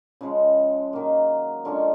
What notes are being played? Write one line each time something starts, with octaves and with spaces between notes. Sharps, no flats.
C#3 F3 G#3
D#3 F#3 A#3
D3 F3 G#3 C#4